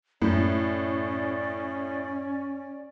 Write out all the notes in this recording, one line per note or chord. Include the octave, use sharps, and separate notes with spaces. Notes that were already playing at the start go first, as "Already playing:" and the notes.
F#2 A2 C#4 D5